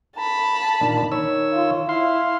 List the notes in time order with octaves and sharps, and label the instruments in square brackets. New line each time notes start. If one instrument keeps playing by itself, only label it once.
[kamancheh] A5 B5
[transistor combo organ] A#2 D#3 D4
D#3 C#5 E6
[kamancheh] F4
[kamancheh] E4 [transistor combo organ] F5 C6